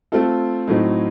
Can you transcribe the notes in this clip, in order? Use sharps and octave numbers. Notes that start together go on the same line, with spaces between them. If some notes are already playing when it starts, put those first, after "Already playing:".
A3 C4 F4 A4
A2 F#3 A3 C4 D#4